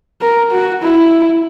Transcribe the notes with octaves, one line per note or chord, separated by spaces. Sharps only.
A#4
F#4
E4